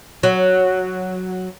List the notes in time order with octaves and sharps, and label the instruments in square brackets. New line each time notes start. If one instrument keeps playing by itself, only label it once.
[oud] F#3